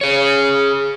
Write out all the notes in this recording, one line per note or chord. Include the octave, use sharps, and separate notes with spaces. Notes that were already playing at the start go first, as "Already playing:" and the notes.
G#4 C#5